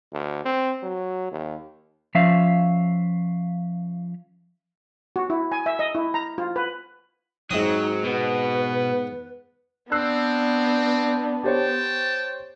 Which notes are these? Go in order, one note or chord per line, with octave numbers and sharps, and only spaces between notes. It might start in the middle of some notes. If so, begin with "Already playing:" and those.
D2
C4
F#3
D#2
F3 C#4 E5 F5
F#4
E4
G#5
E5
D#5
E4
A#5
F4
B4
G#2 F#3 C4 D#4 D#6
B2 B3 B4
B3 C4 D4 E6 F#6 C7
G4 C5 C#5 G5 A5